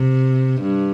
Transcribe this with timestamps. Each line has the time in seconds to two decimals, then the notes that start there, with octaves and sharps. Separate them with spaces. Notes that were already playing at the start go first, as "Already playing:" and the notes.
Already playing: C3
0.61 G2